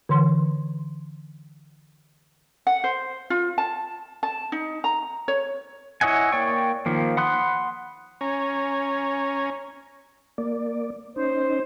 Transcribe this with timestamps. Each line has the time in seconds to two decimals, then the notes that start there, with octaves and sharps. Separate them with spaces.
0.09 D3 E3 C6
2.67 F#5
2.84 C5
3.30 F4
3.58 A5
4.23 A5
4.52 D#4
4.84 A#5
5.28 C#5
6.01 E4 C#5 D#5 F#5 G#5
6.32 A#3 C#5 D5 G5 C#6
6.86 D#3 F3 A#3
7.17 F#5 B5 C6 D#6 F#6
8.21 C#4 C#5 G#5 A#5
10.38 A#3 D5
11.16 C#4 D#4 C5